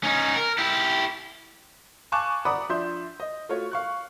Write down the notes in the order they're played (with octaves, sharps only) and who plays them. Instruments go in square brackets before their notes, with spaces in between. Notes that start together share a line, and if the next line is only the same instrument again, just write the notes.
[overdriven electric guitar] C#4 D#4
A#4
E4 G4
[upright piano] F5 G#5 A5 C#6 D6 F#6
D5 F#5 A#5 B5 D6 D#6
F3 D4 E5 C6 G6
D#5
A3 F4 F#4 C#5
F5 C#6 F#6